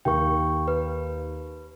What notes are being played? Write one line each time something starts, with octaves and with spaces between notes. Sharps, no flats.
D#2 A#4 F5 G5 C#6
B4